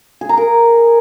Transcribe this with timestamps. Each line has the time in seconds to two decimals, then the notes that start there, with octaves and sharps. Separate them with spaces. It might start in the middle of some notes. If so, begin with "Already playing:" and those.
0.21 G#4
0.29 A#5
0.37 A#4